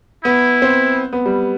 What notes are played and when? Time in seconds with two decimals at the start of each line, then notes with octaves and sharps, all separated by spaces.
0.24 B3 E4
0.62 C4
1.13 B3
1.26 G3